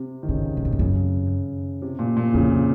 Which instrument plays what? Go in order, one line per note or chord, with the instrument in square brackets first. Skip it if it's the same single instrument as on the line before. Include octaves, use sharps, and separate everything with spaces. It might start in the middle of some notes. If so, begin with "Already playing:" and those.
Already playing: [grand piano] C3
D#3
[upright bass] G#2 [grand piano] C#3
[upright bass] C3
A#2
G#2
[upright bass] F#2 [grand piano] C#3
[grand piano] C3
A#2
A#2
[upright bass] F2 [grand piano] C#3
[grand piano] C3